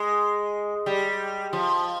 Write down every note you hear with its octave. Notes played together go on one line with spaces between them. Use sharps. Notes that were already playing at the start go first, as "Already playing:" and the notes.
Already playing: G#3
G3
F3